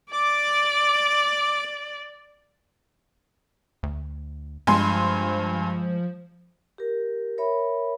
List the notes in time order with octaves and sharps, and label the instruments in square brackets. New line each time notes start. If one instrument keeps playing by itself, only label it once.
[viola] D5 [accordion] D6
[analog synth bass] D2
[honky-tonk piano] G2 G#5 C6 [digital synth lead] F3 [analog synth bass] G#3
[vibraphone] G4 A#4
A#4 C#5 E5 B5